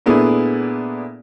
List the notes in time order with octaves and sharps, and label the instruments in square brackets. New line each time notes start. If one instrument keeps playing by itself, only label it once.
[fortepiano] A#2 A3 B3 D4 E4 G#4